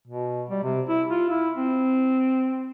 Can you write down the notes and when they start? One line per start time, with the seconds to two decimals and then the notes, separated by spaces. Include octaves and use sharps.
0.07 B2
0.49 G3
0.63 C3
0.88 E4
1.10 F4
1.29 E4
1.55 C4